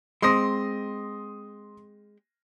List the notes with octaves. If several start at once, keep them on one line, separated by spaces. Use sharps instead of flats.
G#3 C4 C6 D#6 A#6